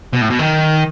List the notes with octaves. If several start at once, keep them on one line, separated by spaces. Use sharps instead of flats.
B2
A2
B2
D#3